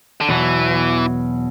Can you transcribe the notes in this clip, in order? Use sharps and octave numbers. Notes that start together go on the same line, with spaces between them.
D3
E2 B2 E3 F#3